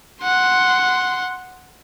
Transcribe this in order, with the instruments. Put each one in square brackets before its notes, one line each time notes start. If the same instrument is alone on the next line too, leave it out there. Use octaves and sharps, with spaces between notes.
[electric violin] F#5 C6